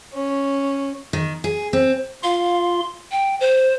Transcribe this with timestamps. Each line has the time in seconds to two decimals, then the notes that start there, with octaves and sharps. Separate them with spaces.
0.14 C#4
1.13 D#3
1.44 G#4
1.73 C4
2.23 F4 F5 C6
3.12 G5
3.40 C5